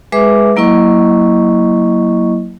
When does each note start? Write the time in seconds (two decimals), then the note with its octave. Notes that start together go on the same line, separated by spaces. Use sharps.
0.12 G#3 G#4 B4 E5 D6
0.56 F#3 A#3 E4 D#5 C#6